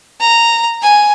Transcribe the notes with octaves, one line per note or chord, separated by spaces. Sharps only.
A#5
G#5